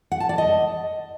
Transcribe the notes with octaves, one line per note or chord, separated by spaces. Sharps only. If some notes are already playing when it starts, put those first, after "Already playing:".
F#5
A5
D5
D#5